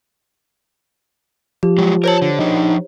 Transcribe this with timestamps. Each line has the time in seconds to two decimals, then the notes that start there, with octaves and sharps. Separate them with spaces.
1.63 F3 G4
1.78 F#3 G#3
2.04 A#4 C5 C#5 A5 F#7
2.22 D3
2.39 F3 D4 D#4